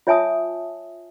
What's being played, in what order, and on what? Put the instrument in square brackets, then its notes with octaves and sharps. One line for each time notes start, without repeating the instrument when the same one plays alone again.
[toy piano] F4 C#5 E5 G#5 A5 D#6